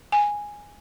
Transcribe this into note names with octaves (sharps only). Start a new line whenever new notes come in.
G#5